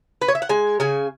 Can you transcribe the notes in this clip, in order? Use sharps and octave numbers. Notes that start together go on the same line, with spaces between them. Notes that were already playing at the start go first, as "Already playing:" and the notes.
B4
C#5
E5
F#5
G#3 G#5
C#3 G#5